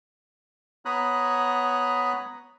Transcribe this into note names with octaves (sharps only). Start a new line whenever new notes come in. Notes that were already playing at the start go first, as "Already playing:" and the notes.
B3 C#5 A#5 B5 D#6 F#6